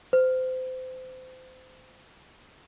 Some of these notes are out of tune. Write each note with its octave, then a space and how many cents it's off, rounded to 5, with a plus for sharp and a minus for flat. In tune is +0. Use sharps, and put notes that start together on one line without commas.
C5 -30